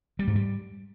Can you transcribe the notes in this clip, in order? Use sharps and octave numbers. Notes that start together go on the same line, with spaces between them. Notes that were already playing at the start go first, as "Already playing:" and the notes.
G3
G#2
G3